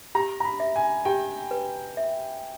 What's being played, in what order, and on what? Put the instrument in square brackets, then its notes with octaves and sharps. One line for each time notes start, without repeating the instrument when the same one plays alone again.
[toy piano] G4 [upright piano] A#5
[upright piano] A#5
B5
[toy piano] E5
[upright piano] G#5
[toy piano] G4 [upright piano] G5
[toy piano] B4
E5